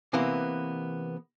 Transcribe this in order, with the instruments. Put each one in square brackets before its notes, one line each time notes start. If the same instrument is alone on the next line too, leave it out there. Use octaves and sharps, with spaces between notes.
[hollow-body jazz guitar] C3 E3 A#3 B3